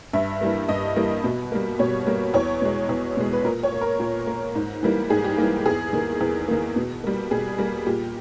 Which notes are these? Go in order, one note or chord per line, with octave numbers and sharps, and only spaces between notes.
G2 E5
E3 G3 A#3
G2 D#5
E3 G3 A#3
B2
G3 A#3
B2 C#5
G3 A#3
E2 C#5
B2 G#3
E2
B2 G#3
B4
A#2 A#4
C#5
A#3
A#4
A#2
A#3
G#2
E3 G3 A#3
G#2 G#4
G4
E3 G3 A#3
E2 G#4
D#3 A#3
E2
D#3 A#3
B2
G3 A#3
B2 G#4
G3 A#3
A#2 G4